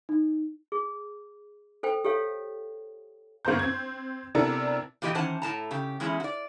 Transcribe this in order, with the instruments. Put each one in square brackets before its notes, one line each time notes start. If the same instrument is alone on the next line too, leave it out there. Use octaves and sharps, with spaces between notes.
[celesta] D#4
[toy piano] G#4
A4 C5 G5
G4 A4 C#5 F5
[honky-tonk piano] G1 A#3 B3 C5 A#5 G6
C4 G#6
C3 B3 D4 E4 A4 A#4
[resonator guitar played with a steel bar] A#2 E3 G4 B4 D#5
D#3 E3 C#4 C5 F#5 A5
A2 A5 A#5
C#3 G4
E2 G#3 C#4 E4 G#4
F#4 D5